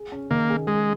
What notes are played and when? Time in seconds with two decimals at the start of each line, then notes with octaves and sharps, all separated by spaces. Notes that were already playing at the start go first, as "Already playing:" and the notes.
Already playing: G#4
0.12 C#4
0.31 D#3 A#3
0.50 G#4
0.67 G#3 G#4